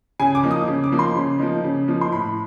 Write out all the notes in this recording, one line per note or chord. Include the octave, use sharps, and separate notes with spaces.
C#3 G#5
D6
F3 A#3 D#4
D#6
C#3
D6
F3 A#3 D#4
C6
C#3
F3 A#3 D#4
C#3
F3 A#3 D#4
C6
A2 B5